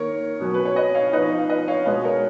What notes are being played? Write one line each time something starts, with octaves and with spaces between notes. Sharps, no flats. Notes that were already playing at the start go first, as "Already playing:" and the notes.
Already playing: D#3 A#3 D#4 A#4 C#5
B2 F#3 C#4
B4
C#5
B4 D#5
C#5 F5
F3 B3 D#4 B4 D#5
F5
B4 D#5
C#5 F5
B2 G#3 B3 B4 D#5
A#4 C#5